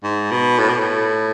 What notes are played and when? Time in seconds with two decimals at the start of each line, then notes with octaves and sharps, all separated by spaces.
0.04 G#2
0.31 B2
0.59 A2
0.70 B2
0.79 A2